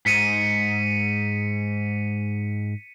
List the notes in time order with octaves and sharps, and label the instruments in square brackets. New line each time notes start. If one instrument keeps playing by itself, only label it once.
[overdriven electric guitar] G#2 [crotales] B6 C#7 D#7